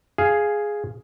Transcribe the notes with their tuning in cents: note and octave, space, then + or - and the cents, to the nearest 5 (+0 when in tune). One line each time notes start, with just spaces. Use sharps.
G#4 +0 F5 +0